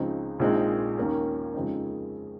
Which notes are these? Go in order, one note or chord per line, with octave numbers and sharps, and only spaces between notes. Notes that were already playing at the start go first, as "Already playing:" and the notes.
Already playing: C#2 C#3 F3 C4 D#4
A#1 A#2 G#3 C4 D#4
D#2 D#3 A#3 C#4
F2 C#3 G#3 C4 D#4